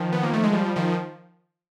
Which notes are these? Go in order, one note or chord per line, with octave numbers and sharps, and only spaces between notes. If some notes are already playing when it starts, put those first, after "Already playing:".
Already playing: D#3 F3
B3
A#3
A3
G#3
F3 G3
D#3 F3